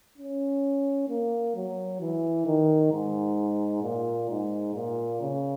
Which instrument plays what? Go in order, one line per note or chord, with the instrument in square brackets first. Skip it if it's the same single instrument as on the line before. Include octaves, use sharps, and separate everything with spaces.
[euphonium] C#4
A#3
F#3
E3
D#3
G#2
A#2
G#2
A#2
C#3